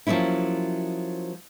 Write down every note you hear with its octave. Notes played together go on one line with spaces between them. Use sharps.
F3 F#3 A#3 C#4 E4